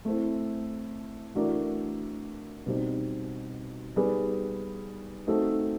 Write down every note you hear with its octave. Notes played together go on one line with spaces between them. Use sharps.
A3 C4 E4
E3 A3 D4 F#4 A#4
B2 G3 C4 D#4
G3 B3 D#4 G#4 B4
A3 C4 D#4 F#4 A4